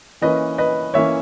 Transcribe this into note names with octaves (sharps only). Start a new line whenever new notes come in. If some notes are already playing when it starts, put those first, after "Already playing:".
E3 A#3 C#4 B4 D#5
B4 D#5
E3 A#3 C#4 C#5 E5